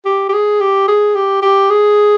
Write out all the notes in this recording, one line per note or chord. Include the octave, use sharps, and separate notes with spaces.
G4
G4
G#4
G4
G#4
G4
G4
G#4